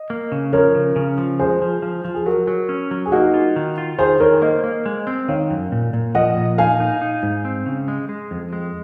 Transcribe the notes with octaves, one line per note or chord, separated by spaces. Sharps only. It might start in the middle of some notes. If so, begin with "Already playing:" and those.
Already playing: D#5
A#3
C#3
F3 A#4 C#5
C#3
C#3
F3
G#3 G#4 C5
F3
F3
F3
G#4
F#3 F#4 A#4
F#3
C#4
F#3
G#4
A#3 D#4 F#4
F4
D#3
F4
D#3 G#4 C5
D#3 A#4 C#5
A#3 C5 D#5
A#3
G#3
C4
D#3 C#5 F5
F#2
A#2
A#2
F3 D#5 F#5
A#2
D#4 F5 G#5
D#4
D#4
G#2
C4
C#3
G#3
G#3
F2
G#3